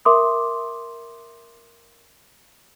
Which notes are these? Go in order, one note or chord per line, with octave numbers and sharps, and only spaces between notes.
A#4 E5 C6 D6 D#6